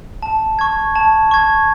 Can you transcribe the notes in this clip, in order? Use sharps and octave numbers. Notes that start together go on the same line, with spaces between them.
A5
C#6 G#6
A5
C#6 G#6